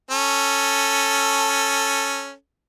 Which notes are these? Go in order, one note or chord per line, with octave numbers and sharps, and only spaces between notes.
C#4 A4